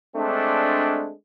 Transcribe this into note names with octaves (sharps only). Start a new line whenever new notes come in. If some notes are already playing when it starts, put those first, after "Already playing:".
G#3 A3 C4 D4